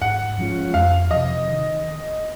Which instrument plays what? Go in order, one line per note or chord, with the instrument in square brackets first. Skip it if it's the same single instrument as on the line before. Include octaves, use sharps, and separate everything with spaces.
[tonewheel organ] G#2 [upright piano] F#5
[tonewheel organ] F3 G#3 C#4 F4
[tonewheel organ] F2 [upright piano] F5
[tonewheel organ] C3 F3 [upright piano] D#5
[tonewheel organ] D#3